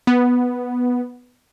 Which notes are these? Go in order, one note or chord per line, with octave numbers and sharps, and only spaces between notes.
B3